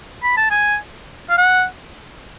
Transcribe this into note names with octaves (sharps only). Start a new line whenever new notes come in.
B5
A5
G#5
F5
F#5